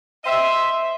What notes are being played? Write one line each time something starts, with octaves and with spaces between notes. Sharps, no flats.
C5 D#5 E5